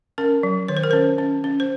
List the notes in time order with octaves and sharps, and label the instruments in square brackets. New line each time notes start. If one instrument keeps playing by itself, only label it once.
[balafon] C#4 A#4
F#3
D#3 C#5
C5
A#4
C#4 C5
C#4
C#4
C5